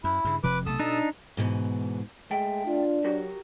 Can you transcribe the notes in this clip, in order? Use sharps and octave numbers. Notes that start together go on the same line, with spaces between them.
F#2 E4
G2 C#3
F1 C3 F3 B4 D6
B1 C3 A3 A4 D#6 E6
B2 D4 D#4
G#2 B2 E3
G#3 A3 G5
D4 F4
F#3 F#4 G4 A#4